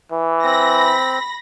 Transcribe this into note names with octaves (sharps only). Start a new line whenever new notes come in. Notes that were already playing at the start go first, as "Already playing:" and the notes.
E3
C4 B5 A#6